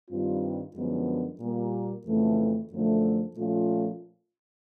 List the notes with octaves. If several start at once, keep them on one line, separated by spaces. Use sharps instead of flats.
G2 D#3 G3 C4 F4
F#2 D3 F3 G#3 B3
A#2 G3 A#3
F2 C#3 E3 A3
F#2 D3 F3 A3
A#2 F3 A3 C#4 F4